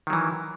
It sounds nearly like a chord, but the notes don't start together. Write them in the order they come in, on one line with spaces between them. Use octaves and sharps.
D#3 F#3 E3